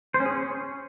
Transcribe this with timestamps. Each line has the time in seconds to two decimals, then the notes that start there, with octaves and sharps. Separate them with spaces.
0.14 C5
0.20 C#4
0.25 G#4
0.31 C#4